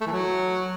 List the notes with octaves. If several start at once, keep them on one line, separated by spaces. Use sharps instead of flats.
A3
E3
F#3